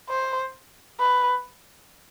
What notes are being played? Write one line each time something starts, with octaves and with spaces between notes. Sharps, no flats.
C5
B4